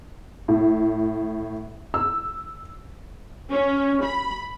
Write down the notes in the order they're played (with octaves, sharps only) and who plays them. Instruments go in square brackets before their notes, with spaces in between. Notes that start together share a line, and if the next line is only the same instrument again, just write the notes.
[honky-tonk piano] A2
E6
[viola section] C#4
B5